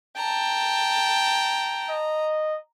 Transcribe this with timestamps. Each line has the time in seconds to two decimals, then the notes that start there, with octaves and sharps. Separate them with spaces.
0.17 G5 A5 A#5
1.90 D#5